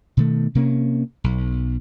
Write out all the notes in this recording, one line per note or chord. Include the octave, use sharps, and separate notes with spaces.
B2 D#3 A3
C3 A#3 C#4
B1